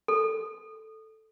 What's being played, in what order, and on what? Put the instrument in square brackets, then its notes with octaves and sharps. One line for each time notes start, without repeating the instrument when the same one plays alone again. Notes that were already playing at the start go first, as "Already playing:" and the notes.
[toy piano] A4